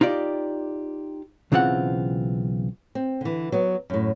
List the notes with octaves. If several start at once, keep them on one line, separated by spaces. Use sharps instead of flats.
D#4 F4 G4 D5
B1 C#3 E3 C4 F4 F#5
C4
D3 E3
F#3 B3
F#2 A2